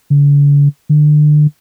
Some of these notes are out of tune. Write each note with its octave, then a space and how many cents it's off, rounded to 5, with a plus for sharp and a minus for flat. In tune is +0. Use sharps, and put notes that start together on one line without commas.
D3 -45
D3 +30